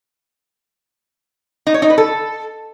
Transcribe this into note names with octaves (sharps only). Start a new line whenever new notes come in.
D#4
C#5
D#4
B4
A4